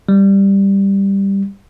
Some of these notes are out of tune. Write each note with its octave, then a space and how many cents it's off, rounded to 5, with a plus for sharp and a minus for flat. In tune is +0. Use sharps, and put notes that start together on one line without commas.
G3 +5